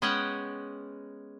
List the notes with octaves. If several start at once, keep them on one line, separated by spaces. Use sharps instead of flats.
G#3 B3 C#4 F#5 G5